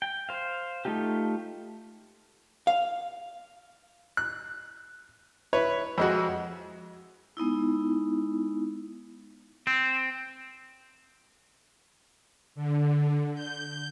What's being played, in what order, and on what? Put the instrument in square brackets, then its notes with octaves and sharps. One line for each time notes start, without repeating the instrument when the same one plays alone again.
[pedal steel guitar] G5
C5 F5
A3 D#4 F4 G4
[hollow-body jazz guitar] F5
[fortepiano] F#6
E4 B4 C#5
F2 G#3 F#4
[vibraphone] G#3 B3 D#4 E4
[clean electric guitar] C4
[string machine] D3
G6